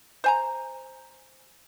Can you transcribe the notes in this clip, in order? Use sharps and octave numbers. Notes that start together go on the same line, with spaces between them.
C5 G#5 A#5